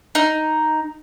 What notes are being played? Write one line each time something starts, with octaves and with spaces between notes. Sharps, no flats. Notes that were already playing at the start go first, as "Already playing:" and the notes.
D#4